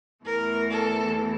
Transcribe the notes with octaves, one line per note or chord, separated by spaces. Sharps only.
E2 E3 A3 A#4
A4